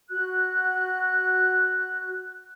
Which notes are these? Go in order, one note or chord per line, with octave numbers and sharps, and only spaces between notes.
F#4 F#6